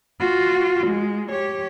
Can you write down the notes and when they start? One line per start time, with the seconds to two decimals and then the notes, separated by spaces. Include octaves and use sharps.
0.20 F4 F#4
0.87 G#3
1.31 G4 C#5